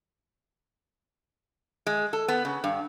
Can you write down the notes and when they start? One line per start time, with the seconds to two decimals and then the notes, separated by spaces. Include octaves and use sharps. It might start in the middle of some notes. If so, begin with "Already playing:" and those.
1.87 G#3
2.13 A4
2.28 B3
2.45 C#3
2.64 G2